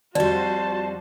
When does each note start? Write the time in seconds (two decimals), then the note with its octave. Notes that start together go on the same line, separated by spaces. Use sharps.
0.15 F2 G3 F#4 C5 D5 A5